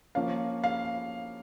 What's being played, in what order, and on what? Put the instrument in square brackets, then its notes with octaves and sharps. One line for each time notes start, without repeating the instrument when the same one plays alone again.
[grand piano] F3 A#3 C#4 [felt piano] F5
[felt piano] F5